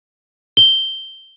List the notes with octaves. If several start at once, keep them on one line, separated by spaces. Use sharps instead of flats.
G7